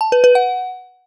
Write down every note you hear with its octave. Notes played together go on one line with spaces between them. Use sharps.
A5
B4
B4
F#5